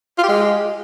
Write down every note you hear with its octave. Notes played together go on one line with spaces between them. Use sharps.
F4
G4
G#3